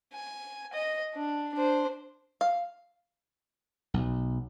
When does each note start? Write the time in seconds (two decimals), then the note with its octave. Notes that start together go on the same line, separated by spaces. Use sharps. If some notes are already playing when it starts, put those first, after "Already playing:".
0.14 G#5
0.74 D#5
1.15 D4
1.54 D4 C5
2.41 F5
3.94 B1